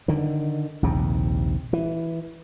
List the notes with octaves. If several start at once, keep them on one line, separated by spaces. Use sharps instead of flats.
D3 D#3
A#1 D#2 C3
E3